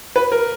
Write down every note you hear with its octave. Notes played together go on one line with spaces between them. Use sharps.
B4
A#4